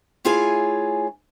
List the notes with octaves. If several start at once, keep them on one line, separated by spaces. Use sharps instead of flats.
A3 E4 F4 G#4 C#5 G#5